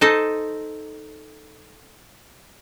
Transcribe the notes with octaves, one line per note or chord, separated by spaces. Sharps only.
D#4 A4 C5 D#5